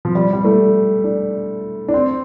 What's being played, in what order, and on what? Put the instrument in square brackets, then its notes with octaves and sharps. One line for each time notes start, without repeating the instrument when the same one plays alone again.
[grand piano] F3
G3
G3
A3
D4
D4
C4